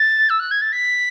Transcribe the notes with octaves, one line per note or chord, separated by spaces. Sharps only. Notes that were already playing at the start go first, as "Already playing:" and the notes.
Already playing: A6
E6
F#6
G#6
A6
B6